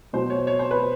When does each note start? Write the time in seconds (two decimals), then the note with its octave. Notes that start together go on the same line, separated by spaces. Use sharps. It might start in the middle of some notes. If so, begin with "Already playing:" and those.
0.13 B2 F#3 C5
0.30 C#5
0.47 C#5
0.59 C5
0.71 B4